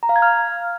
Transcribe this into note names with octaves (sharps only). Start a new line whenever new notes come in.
A#5
F5
G#6
F6